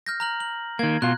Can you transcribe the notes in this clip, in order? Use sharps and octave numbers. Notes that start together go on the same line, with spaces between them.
F6 G6 A#6
A#5 F6 F#7
F#7
D#3 A#3 G#6
B2 F4 F#6